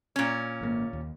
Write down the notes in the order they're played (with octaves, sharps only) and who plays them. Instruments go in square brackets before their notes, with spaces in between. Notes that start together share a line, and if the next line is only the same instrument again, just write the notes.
[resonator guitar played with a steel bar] A#2 C#4
[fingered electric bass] G#1 D3 A#3
D#2